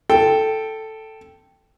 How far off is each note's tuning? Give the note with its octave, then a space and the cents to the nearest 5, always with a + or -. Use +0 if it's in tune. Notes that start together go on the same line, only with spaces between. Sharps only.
A4 +0 G5 +0